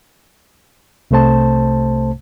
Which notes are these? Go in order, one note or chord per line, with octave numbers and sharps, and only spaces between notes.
C2 C3 A3 C5 A5